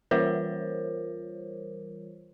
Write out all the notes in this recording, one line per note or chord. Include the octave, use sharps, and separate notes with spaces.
E3 G3 F4 A#4 C5 C#5